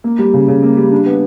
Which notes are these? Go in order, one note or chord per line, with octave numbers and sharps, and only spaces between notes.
A#3
G3
C#3
C#3
A#3
G3
D4
B3